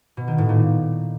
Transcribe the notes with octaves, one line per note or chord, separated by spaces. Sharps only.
B2
D#3
A2
A#2